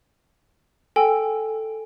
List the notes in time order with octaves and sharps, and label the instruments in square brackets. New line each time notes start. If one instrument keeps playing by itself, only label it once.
[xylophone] A4 G5 G#5 E6